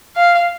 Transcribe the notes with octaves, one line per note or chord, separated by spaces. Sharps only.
F5